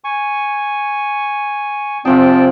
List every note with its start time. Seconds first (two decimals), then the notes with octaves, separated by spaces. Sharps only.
0.04 G#5 C#6
2.05 C3 F3 C4 G#4 D5 G5 A5